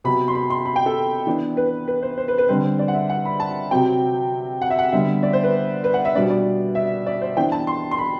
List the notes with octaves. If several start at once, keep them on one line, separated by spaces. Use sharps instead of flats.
C3 F#3 B3 B5
C6
B5
C6
B5
G5
A4
E3 B3 D4
B4
B4
C5
C5
B4
B4
D3 G3 C4 C5
D5
F#5
E5
F#5
B5
A5
C3 F#3 C4 G5
F#5
E5
F#5
D3 G3 B3 E5
D5
C5
B4
B4
F#5
E5
B2 G3 B3 D4 D5
D5
E5
D5
C5
E3 B3 D4 G5
A5
C6
C6
B5